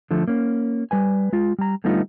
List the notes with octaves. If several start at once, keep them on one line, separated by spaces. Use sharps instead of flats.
D3 F3 A3
A#3 C#4
G3 B4 G#5
G#3 F4
G3 A#5
D3 G3 A3 B3 D#4 F4